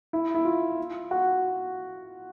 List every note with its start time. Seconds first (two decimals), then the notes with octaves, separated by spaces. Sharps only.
0.13 E4
0.35 E4
0.45 F4
1.11 F#4